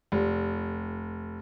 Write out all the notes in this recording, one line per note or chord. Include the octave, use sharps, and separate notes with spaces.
F1